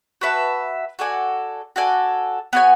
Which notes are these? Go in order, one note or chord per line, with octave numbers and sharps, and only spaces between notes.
F#4 B4 E5 A5
F#4 A4 D5 G#5
F#4 A4 D5 G#5
B3 F#4 C#5 G#5